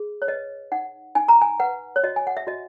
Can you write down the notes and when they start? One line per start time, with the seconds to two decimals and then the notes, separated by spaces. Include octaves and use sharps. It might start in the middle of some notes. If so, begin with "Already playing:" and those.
Already playing: G#4
0.22 C#5
0.28 B4 D#5
0.72 D#4 F#5
1.15 D#4 G#5
1.28 A#5
1.42 G#5
1.60 B4 F#5
1.96 C#5
2.03 F#4 D#5
2.16 G#5
2.27 F#5
2.37 E5
2.47 F#4 D#5